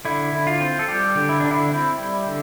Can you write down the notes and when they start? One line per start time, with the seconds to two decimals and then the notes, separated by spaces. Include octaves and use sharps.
0.05 D3 E4
0.33 D3
0.47 F4
0.60 C4
0.79 A4
0.88 G3 G4
1.15 D3
1.29 E4
1.40 D3 D4
1.51 E4
1.71 C4 E4
1.98 G3
2.26 D3